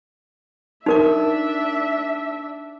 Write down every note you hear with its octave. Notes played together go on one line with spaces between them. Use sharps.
D4 D#4 A#4 E5 D6